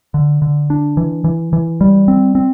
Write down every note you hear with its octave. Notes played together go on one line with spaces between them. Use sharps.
D3
D3
D4
E3
E3
E3
G3
C4
C4